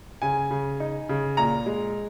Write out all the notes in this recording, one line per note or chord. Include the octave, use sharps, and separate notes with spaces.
C#3 G#5
C#3
D#4
C#3
A#2 A#5
G#3